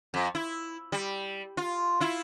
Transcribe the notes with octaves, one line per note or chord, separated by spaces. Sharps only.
F2
E4
G3
F4
E4 F4